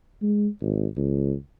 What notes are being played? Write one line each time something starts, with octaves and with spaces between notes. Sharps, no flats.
G#3
G#1
C#2